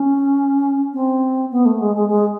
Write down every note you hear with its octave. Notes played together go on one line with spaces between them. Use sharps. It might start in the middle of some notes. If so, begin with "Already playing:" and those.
Already playing: C#4
C4
B3
A3
G#3
G#3
G#3